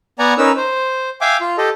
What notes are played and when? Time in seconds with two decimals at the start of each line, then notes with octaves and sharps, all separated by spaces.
0.19 B3 D5 F#5 G#5 A#5
0.38 C#4 D#4 A#4 B4 E6
0.57 C5
1.21 E5 F5 G5 G#5 D6
1.41 F4
1.58 G4 A4 D#5